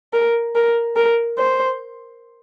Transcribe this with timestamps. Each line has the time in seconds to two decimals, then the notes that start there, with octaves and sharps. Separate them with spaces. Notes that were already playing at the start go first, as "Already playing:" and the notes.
0.13 A#4
0.55 A#4
0.96 A#4
1.38 C5